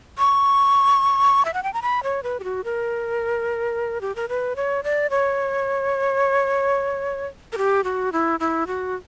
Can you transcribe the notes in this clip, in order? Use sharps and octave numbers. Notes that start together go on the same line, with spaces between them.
C#6
E5
F#5
G5
A#5
B5
C#5
B4
G4
F#4
A#4
G4
A#4
B4
C#5
D5
C#5
A#4
G4
F#4
E4
E4
F#4